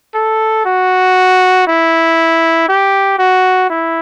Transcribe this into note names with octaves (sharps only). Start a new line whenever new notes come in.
A4
F#4
E4
G4
F#4
E4